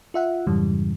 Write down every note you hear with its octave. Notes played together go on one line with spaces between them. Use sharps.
F4 E5 F#5
F2 G#2 C#3 E3 G3